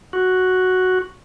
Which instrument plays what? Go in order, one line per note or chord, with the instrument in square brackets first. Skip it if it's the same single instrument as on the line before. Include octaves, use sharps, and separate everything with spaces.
[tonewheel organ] F#4